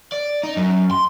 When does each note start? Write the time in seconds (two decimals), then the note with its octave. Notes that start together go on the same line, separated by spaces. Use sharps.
0.12 D5
0.43 D#4
0.57 F#2
0.91 C6